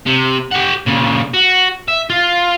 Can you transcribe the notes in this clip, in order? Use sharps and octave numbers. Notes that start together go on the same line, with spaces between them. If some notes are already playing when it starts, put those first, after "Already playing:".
C3
G4 F#5
A#2 C#3
F#4
E5
F4